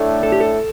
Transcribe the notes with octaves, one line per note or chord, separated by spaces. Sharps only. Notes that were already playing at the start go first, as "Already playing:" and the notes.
Already playing: A2 A3 D4
A4
G4
A4